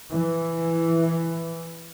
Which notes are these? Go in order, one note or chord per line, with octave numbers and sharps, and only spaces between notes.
E3